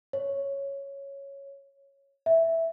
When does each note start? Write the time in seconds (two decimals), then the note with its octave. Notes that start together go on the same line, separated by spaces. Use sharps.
0.13 C#5
2.26 E5